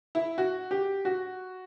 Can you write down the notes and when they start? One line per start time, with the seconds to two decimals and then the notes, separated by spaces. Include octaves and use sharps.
0.15 E4
0.38 F#4
0.71 G4
1.05 F#4